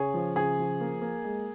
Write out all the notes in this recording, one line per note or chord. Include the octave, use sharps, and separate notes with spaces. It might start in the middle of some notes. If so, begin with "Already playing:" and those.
Already playing: C#3 G#4 C#5
F3
C#3 G#4
F3
A#3
A#3
G#3